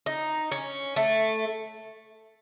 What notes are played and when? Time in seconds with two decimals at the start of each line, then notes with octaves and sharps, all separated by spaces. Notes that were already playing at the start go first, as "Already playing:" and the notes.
0.06 D#4
0.51 C#4
0.96 A3